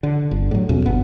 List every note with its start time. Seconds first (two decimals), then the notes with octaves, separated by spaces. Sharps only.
0.03 D3
0.31 G1
0.51 A2 F#3
0.69 E2 B2 C#4
0.86 G1 B3